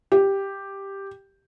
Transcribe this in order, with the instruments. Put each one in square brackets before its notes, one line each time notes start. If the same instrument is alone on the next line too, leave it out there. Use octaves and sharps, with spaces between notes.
[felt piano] G4